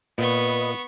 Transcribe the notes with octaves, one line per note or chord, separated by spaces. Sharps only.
A#2 B3 B4 D#5 C#6